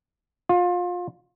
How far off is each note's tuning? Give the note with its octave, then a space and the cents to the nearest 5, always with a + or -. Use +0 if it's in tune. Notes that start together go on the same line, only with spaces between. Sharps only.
F4 +25